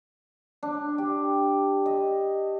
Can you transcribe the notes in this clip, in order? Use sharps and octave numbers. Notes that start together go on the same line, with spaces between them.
D4
G4
D#5